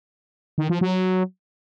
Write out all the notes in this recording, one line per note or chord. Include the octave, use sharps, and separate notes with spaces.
D#3
F3
F#3